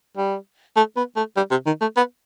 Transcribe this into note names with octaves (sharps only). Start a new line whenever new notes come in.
G3
A3
B3
A3
G3
C3
D#3
A3
B3